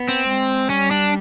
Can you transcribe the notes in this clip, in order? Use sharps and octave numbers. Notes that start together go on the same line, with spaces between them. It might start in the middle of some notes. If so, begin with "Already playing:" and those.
Already playing: B3
C4
G#3
G3 C#4
D4